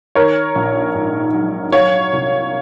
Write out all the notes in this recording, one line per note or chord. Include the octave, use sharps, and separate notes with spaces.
D#3 A#4 C#5
A#1
G#2
F#3
F#3 C#5 F5
C2